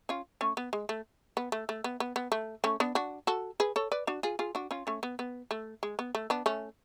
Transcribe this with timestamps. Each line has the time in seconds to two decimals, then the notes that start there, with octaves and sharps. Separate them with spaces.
0.09 C#4 F4
0.41 A3 C#4
0.57 B3
0.73 G#3
0.89 A3
1.37 B3
1.52 A3
1.69 A3
1.84 B3
2.00 B3
2.16 B3
2.32 A3
2.64 A3 C#4
2.80 B3 D4
2.95 D4 F#4
3.27 F#4 A4
3.60 G#4 B4
3.76 A4 C#5
3.92 B4 D5
4.07 D4 F#4
4.23 F4 G#4
4.39 F4 G#4
4.55 D4 F#4
4.71 C#4 F4
4.87 A3 C#4
5.03 B3
5.19 B3
5.51 A3
5.83 G#3
5.99 B3
6.15 A3
6.30 B3 D4
6.46 A3 C#4